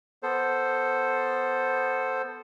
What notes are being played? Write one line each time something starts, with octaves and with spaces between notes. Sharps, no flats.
B3 A4 C5